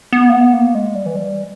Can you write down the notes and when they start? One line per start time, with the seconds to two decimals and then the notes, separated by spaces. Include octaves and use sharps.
0.13 B3
0.29 A#3
0.33 B3
0.54 A#3
0.75 G#3
0.95 G3
1.06 E3
1.16 G3